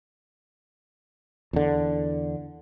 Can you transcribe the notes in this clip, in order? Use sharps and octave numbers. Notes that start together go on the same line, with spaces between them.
E2 D3